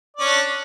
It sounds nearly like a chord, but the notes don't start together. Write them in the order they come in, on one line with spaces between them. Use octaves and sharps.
D5 C#4 D4